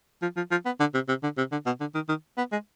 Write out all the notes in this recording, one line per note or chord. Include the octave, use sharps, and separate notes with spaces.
F3
F3
F3
B3
D3
C3
C3
D3
C3
D3
B2
D3
D#3
D#3
B3
G#3